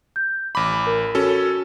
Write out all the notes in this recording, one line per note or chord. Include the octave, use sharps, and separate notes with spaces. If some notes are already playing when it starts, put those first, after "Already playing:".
G6
A1 B5 D6
A#4
C#4 F#4 A4